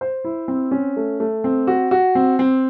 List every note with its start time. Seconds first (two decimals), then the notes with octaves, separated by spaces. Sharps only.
0.01 C5
0.24 E4
0.48 C4
0.71 C#4
0.96 A3
1.20 A3
1.44 C4
1.67 F#4
1.91 F#4
2.15 C4
2.39 C4